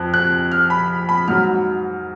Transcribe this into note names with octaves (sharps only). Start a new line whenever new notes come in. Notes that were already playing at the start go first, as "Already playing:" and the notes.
Already playing: F2 F3 F#6
F#6
F6
B5
B5
G#2 F#3 F6